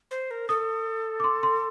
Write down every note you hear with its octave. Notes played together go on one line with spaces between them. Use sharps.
C5
A#4
A4 D#6
D6
C6
C6